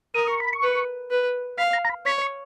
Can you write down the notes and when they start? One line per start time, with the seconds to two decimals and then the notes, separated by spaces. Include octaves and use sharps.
0.15 A#4 D#6
0.27 C#6
0.40 B5
0.53 C#6
0.62 B4
1.11 B4
1.58 F5 B5
1.73 A#5
1.85 A#5
1.89 B5
2.06 C#5 B5
2.22 C#6